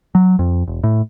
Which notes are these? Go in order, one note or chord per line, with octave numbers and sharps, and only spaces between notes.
F#3
F2
E1
A2